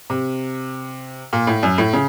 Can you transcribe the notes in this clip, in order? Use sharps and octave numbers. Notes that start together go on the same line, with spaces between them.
C3
A#2
A2
F#2
A2
C#3